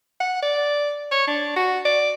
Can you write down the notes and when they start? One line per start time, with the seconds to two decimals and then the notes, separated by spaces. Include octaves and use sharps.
0.20 F#5
0.42 D5
1.11 C#5
1.27 D4
1.56 F#4
1.85 D5